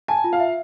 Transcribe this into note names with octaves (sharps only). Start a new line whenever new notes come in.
G#5 A5
F4
F5
E5